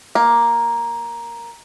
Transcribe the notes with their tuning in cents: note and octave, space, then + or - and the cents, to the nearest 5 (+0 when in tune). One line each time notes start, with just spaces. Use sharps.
A#3 +5